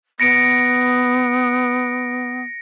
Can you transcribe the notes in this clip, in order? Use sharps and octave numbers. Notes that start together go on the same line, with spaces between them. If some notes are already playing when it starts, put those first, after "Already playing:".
B3 A#6 C#7 D7